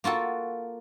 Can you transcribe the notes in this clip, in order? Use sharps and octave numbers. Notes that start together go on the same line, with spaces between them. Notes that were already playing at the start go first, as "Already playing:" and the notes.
A#3 F4 F#4 A4